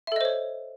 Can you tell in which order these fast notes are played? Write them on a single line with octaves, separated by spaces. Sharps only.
E5 A4 D#5 C5 C#5